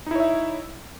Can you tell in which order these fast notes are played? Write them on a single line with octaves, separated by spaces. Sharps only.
D#4 E4 C#5 E5